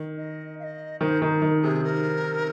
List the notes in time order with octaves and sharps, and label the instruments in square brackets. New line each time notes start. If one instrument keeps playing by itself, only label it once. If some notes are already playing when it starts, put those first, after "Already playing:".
Already playing: [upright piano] D#3
[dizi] D#5
F5
D#5
[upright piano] D#3 [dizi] C5
[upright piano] D#3
D#3
[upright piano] C3 [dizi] G#4
[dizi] A#4